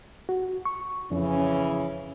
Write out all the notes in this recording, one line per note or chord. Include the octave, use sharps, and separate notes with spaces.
F#4
C#6
F2 C#3 E3 C#4